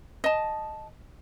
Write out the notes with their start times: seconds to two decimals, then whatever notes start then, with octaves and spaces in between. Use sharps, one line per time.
0.24 D#5 A5